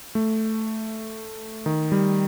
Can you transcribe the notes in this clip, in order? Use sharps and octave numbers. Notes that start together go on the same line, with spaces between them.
A3
D#3
G3